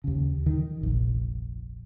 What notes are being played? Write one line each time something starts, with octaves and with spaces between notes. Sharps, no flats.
D#2 C#3
D#3
F1 A#1